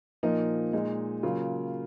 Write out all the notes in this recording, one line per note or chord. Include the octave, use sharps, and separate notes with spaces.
A#2 F3 A#3 D#4
A#2 G#3 D#4
C#3 F#3 A#3 F4